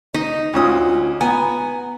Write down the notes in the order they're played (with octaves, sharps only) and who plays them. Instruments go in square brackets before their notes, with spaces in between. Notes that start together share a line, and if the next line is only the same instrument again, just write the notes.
[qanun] D#4 [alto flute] D#5
[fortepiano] D2 C#4 D#6 [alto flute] F4
[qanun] B3 [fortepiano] G#5 [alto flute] A#5